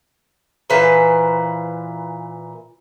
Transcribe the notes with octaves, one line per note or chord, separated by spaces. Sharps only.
A#2 E3 B4 C5